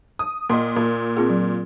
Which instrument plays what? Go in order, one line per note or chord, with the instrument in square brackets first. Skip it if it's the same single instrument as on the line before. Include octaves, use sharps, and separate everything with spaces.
[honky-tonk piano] D#6
[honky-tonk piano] A#2 C6 [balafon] A#3 D#5
[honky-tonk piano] A#2
[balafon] C4 F4 G#4
F#3